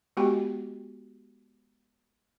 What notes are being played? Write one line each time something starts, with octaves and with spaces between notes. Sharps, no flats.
G#3 B3 F#4 G4 G5 G#5